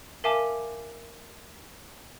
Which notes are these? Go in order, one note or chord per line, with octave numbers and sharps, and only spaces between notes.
A#4 E5 F5 G#5 A5 D6